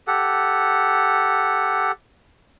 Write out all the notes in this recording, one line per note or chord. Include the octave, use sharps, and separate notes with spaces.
G4 A4 F#5